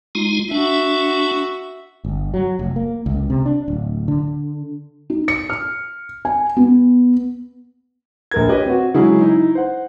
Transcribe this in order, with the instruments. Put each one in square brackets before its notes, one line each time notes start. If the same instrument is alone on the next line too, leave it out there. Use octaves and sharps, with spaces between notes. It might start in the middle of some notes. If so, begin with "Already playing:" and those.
[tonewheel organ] G#3 D#4 F4
[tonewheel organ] D4 [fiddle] F#4 E5
[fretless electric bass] G1
F#3
F1
A#3
C#2
C3
D4
D1
D3
[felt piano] D#4
C#7
F6
G#5
B3
[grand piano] A#1 A#4 G#6
G4 B4 C#5 D#5
C4 F#4
C#3 F#3 G#3 C#4 E4 G#4
D#4 E4
C5 F#5